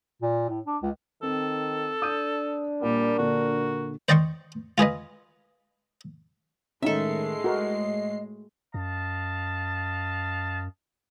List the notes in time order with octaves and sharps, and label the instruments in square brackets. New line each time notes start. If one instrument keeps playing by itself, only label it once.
[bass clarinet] A#2
A2
D4
C#2
[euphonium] D#3 [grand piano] C4 [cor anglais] A4
[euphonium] D4 [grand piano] D#6 G6 D#7
[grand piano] A#2 [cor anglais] G3 [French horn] A#4
[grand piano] A#2 D3 [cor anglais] F#4
[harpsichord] C5 D5 D#5 G5 C6 C#6
F4 G#4 B4 D#5
[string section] A2 G#3 C7 [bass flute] D#3 [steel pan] C#4 D#4 [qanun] A4 E5
[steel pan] F#4 A#4 [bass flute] D#5
[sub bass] F#2 [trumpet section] D#5 F5 A5